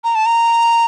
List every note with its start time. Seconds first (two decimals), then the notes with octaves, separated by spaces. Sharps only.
0.04 A#5
0.15 A5
0.26 A#5